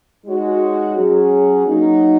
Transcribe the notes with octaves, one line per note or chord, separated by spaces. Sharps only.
G#3 D#4 F#4 C#5
F#3 C#4 G#4
F#3 A#3 D#4